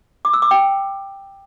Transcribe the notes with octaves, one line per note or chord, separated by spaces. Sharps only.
D6
E6
D6
G5